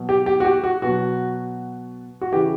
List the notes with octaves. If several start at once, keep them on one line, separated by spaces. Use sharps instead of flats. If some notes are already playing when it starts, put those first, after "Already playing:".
Already playing: B2 F#3
G4
G4
F#4
G4
F#4
B2 F#3 F#4
F#4
C#3 E3 G4